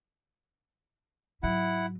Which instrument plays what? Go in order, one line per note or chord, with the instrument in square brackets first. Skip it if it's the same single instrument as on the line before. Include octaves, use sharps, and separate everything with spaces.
[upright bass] G#2 F#3 [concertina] E4 F#5